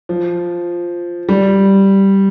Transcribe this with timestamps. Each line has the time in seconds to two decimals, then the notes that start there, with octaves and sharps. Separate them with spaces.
0.09 F3
1.29 G3